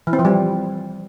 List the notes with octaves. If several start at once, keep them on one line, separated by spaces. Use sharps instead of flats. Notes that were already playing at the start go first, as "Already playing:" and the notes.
E3
C4
F3
G3